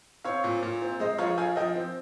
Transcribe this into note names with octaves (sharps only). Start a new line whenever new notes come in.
C4 C#5 F5
A#2
A#2
C4
G#3 C5 D#5
F3 C#5 F5
F3 F5 G#5
F3 D#5 G5
C4